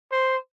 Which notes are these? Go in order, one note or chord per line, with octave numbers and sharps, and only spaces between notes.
C5